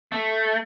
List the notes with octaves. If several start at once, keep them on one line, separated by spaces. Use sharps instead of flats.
A3